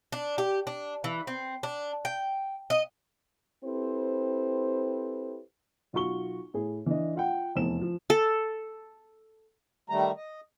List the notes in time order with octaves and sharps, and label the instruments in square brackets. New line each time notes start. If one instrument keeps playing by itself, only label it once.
[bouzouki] D4
G4
D4
E3
C4
D4
G5
D#5
[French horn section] C4 E4 G4 A4 B4 C5
[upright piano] B1 F4 F#4 C#6 G7
A2 G#4
E3 D4 D#5
F4 F#5 G5
F1 E2 E7
F3
[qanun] A4
[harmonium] D#3 G3 A3 A#5
D#5